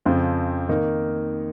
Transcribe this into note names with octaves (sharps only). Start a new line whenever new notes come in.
F2 C#3 F3 C4
D#3 A#3 D#4 A#4